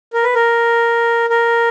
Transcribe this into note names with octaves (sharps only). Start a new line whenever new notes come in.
A#4
B4
A#4
A#4